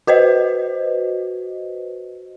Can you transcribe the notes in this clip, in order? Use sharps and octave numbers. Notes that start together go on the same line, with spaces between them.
F#4 B4 C5 D#5